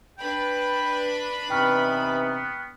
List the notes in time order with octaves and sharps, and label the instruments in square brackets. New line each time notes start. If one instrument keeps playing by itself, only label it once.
[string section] D4 B4 B5 [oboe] G5
[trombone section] C3 E3 D#4 [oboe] B3 [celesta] G5 C#6 F6